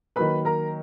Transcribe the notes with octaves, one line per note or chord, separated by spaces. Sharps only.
D#3 F#3 A#3 B4 B5
A#4 A#5